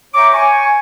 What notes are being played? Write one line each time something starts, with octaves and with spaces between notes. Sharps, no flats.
C#5 E5 G5 A#5 C#6 D6
G#5 C#6